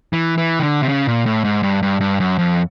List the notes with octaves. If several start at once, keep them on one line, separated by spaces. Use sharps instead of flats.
E3
E3
D#3
D3
C3
C#3
A#2
A2
G#2
G2
G2
G2
F#2
F2